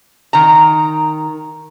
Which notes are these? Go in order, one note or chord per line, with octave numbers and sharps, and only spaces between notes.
D#3 A#5